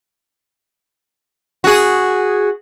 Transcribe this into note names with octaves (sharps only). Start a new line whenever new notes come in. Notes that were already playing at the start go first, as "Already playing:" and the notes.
F#4 G#4